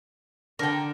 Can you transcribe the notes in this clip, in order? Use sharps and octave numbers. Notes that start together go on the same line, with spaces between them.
D3 A#4 G5